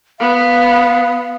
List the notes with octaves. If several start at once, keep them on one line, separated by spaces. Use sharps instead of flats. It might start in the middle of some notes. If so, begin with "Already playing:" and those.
B3 F5